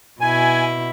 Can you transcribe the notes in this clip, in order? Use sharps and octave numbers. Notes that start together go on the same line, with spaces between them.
B2 E4 G#5